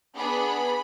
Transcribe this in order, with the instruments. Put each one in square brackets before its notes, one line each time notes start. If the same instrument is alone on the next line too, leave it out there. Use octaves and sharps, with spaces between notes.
[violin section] B3 D4 G#4 B5